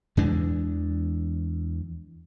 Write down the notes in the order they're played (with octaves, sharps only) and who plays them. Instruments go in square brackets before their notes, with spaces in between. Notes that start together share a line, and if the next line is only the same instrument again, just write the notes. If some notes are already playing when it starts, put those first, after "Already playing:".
[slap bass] E2 E3 G#3 D4